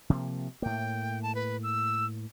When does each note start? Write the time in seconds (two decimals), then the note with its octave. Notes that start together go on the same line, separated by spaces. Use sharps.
0.10 C3 F3 A#3
0.62 A2 A#3 G5
1.23 A5
1.35 B4
1.63 E6